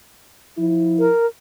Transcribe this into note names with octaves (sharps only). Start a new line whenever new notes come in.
F3 E4
A#4